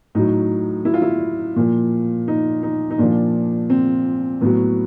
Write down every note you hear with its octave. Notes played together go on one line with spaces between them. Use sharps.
A2 F#3 D#4
E4
F4
E4
A#2 F3
D#4
D#4
D#4
A#2 F3 D4
C4
A2 F#3 B3